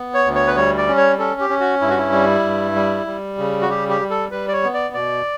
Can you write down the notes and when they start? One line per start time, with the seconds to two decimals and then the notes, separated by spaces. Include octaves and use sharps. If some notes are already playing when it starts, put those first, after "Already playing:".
Already playing: B3
0.14 C#5
0.24 D2
0.35 C#5
0.47 B4
0.56 G3 C#5
0.77 D5
0.87 C#4
0.98 C#5
1.19 C#4 A4
1.40 G4
1.49 C#4
1.60 F#4
1.81 G2 E4
1.90 F#4
1.97 E4
2.12 G3
2.44 G2
2.75 G3
3.07 G3
3.38 C#3
3.62 F#4
3.69 G3 G4
3.89 G4
4.01 G3
4.10 A4
4.31 G3 B4
4.48 D5
4.53 C#5
4.63 B3
4.74 D5
4.94 B2 D5